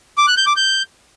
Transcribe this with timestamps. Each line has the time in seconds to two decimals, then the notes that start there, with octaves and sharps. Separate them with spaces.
0.18 D6
0.27 F#6
0.37 G6
0.47 D6
0.56 G6